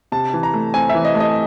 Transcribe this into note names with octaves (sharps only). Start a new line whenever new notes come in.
C3 A5
E3
A#5
A3
C4 G#5
E5
E3
D#5
A3
D#5